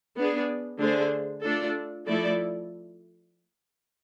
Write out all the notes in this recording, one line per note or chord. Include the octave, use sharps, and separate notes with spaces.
B3 D4 G#4
D3 A3 D4 G#4 C5
A3 D4 F4 A4
F3 A3 E4 A4 D5